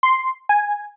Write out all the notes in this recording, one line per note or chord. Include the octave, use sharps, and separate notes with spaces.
C6
G#5